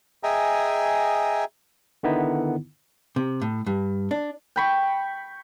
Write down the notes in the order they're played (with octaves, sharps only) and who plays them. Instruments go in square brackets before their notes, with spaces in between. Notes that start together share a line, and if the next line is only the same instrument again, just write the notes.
[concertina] G#4 D#5 E5 G5 G#5 A#5
[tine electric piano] D3 D#3 B3 D#4 E4
[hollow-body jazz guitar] C3
A2
G2
D4
[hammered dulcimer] G5 B5 C#6